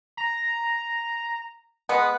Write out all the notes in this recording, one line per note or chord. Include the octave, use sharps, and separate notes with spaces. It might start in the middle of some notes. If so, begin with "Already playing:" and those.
A#5
G#3 B3 F#5